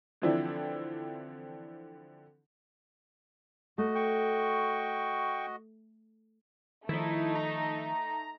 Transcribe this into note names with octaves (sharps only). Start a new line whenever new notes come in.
D3 E3 F3 C4 D4 E4
A3 F#4 D#5
G5 C#6
D#3 F3 A3 D#4 E4
A#5